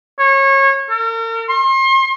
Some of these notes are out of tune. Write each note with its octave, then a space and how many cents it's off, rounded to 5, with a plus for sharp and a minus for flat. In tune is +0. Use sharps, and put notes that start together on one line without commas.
C#5 -25
A#4 -40
C6 +40